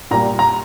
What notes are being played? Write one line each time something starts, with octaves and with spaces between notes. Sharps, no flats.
A#2 G3 A#5
A#5